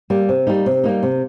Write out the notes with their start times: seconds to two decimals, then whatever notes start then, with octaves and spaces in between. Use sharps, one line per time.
0.10 G3 A#3
0.29 C3
0.47 G3 A#3 D#4
0.66 C3
0.84 G3 A#3 D#4
1.03 C3